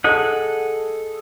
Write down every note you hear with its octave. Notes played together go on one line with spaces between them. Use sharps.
G#4 A4 D#5 F#5